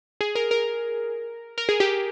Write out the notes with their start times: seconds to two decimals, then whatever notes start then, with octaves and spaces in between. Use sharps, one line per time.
0.21 G#4
0.35 A#4
0.51 A#4
1.58 A#4
1.69 G#4
1.80 G4